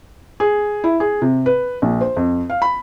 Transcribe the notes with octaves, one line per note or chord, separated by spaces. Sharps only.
G#4
E4
G#4
C3
B4
A#1
C5
F2
F5
B5